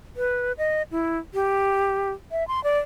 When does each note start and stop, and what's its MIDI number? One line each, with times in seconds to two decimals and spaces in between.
0.16 0.52 71
0.58 0.82 75
0.91 1.18 64
1.34 2.11 67
2.32 2.47 76
2.48 2.63 84
2.64 2.79 74